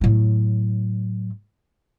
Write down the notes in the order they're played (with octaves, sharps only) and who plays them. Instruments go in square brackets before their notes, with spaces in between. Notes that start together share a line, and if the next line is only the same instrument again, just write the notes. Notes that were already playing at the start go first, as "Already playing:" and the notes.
[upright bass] A2 F#3